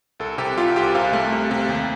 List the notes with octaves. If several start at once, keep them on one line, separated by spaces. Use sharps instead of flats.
C2 A4
C3 G4
C2 F4
C2 G4
C3 F5
A3
C3
C3
D#2